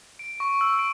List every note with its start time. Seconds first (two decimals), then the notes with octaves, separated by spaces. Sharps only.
0.19 D7
0.40 C#6
0.61 E6
0.79 D7